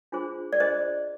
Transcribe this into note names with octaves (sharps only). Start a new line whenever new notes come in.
D4 F4 G#4 C5
D5
D4 F4 G#4 C5 D#5